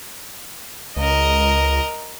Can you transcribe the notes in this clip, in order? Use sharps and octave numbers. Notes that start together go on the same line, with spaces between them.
C#2 A#4 D#5